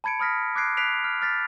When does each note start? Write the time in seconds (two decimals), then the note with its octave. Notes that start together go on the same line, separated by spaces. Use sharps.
0.04 A5 B5 G#6 C#7 D7
0.20 B5 D#6 F6 A#6 B6
0.55 D6 F#6 G#6 C7 D7
0.77 F#6 B6 C7 D7 F7
1.04 F6
1.22 F6 A6 B6